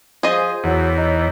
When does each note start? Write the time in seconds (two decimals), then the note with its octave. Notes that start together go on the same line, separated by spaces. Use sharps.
0.23 F3 G#4 C5 D#5
0.64 E2 F#3 C#5
0.97 D#4